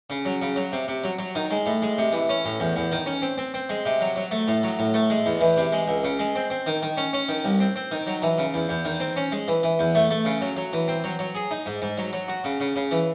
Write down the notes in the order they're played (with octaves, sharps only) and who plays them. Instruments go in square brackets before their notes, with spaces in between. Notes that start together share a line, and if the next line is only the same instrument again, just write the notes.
[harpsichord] C#3
F#3
C#3
F#3
C3
C3
F#3
F#3
D#3
G#3
A2
G#3
C3
E3
C#4
A2
E2
E2
D#3
C#4
C4
C4
C4
G#3
C3
F#3
F#3
A3
A2
F#3
A2
A3
G#3
E2
E3
C3
G#3
C#2
C#3
G#3
C4
C4
D#3
D#3
C#4
C#4
D#3
C2
C4
C4
D#3
F#3
E3
C#3
E2
E2
D#3
C4
C#4
G#3
E3
E3
E2
A3
A3
C#3
F#3
F#3
E3
C4
F#3
F#3
G#4
D#4
G#2
G#2
F#3
F#3
F#4
C#3
C#3
C#3
E3